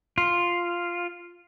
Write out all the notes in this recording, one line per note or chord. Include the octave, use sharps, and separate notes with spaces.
F4